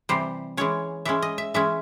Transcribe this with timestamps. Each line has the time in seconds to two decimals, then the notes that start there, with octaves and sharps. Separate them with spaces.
0.09 C3 E3 G3 C5
0.57 E3 G#3 C#4 C#5
1.05 E3 G#3 C#4 E5
1.22 D#5
1.38 E5
1.54 E3 G#3 C#4 E5